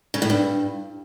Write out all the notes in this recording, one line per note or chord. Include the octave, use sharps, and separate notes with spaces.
C#3
A2
G2